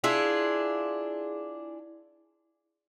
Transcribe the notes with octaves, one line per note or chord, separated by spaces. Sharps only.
D4 E4 F4 G#4